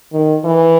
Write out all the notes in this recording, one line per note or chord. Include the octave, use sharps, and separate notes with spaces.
D#3
E3